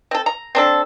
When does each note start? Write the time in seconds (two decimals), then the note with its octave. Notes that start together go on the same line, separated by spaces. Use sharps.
0.11 C4 A4
0.26 A#5
0.55 C4 D4 A4